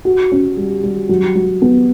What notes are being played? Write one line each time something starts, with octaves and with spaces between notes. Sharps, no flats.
F#4
C#4
G3
G3
F#3
F#3
B3